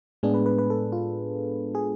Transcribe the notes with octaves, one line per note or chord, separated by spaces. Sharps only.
A2 G#3 B3 D4 G#4
B4
B4
B4
A4
F4
G#4